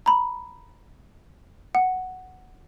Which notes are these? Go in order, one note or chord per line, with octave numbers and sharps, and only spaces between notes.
A#5 B5
F#5